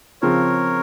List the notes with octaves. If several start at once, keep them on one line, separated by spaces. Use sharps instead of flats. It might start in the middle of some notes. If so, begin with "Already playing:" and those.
C#3 F3 C4 F4 A#4 C#5